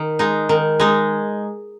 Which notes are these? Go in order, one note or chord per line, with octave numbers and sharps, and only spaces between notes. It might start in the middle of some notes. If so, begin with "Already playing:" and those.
Already playing: D#3
G#3 D#4
D#3
G#3 D#4